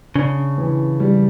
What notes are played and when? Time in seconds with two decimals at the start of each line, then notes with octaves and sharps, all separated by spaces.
0.16 C#3 D4
0.58 E3
1.00 G3